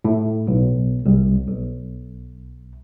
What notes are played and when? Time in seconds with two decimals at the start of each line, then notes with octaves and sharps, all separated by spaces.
0.05 A2
0.47 B1
1.06 C2
1.48 B1